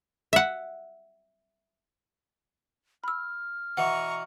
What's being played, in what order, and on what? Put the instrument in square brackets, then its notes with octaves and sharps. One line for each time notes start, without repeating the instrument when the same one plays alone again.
[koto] E5 F#5
[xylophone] B5 E6 [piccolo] F6
[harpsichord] B2 E3 [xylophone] F#5 [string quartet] A#5 C#6